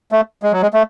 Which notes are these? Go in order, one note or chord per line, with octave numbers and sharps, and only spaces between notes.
A3
G#3
F#3
G#3
A3